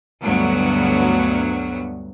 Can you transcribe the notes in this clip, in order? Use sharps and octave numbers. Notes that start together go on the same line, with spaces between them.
D2 G2 F#3 B3